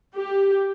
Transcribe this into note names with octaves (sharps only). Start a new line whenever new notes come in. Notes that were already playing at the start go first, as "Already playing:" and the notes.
G4